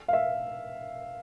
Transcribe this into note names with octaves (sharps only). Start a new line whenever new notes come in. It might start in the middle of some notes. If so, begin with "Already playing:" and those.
F5
E5